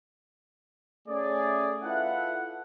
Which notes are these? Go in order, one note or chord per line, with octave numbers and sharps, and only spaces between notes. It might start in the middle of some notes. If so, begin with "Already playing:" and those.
A3 C#4 G#4 D5
E4 F4 A4 B4 E5 F#5